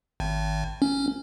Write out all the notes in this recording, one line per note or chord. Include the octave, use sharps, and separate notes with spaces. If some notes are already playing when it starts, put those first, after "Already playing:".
G#1
C#4